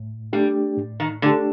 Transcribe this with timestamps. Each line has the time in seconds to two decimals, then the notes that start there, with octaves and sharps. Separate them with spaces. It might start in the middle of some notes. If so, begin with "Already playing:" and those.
Already playing: A2
0.33 G3 A3 D4 G4
0.77 A2
1.00 D#3
1.22 D3 A3 D4 G4